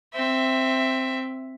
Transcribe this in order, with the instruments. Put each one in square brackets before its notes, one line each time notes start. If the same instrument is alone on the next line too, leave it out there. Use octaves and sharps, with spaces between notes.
[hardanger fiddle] C4 E5